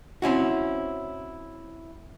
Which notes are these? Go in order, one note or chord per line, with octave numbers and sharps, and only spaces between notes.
C4 C#4 E4 F#4